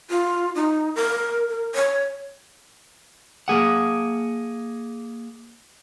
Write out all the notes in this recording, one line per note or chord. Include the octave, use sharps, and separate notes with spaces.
F4
D#4
A#4
A#4
C#5
A#3 G#4 F#5